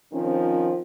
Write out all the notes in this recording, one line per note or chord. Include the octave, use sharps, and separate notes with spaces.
D#3 F3 C4 C#4